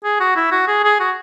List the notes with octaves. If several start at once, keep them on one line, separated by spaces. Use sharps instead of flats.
G#4
F#4
E4
F#4
G#4
G#4
F#4